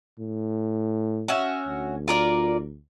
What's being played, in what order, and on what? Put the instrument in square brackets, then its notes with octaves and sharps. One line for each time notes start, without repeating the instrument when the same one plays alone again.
[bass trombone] A2
[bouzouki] C#4 F#4 E5
[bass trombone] D2
[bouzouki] F4 A#4 D5